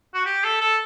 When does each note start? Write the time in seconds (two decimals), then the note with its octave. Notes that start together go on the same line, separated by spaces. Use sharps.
0.14 F#4
0.26 G4
0.44 A4
0.61 A4